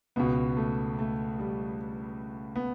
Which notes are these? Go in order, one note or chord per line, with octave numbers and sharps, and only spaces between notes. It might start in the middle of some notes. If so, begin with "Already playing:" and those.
C#2 B2 B3
A3
A3
G3
B3